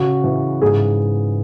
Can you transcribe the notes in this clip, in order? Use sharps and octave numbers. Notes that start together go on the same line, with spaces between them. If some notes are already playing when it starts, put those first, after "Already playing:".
Already playing: C#3 F#4
E3
G#2 G#4